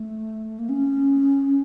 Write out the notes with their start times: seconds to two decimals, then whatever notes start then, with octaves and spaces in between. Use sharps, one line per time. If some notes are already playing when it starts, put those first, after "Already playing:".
Already playing: A3
0.59 A#3
0.69 C#4